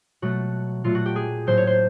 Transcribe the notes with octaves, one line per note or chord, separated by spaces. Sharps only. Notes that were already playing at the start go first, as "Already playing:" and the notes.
B2 F#3 A3 F#4
A#2 F#3 A3 F4
F#4
G4
G#4
A2 F#3 A#3 C5
C#5
C5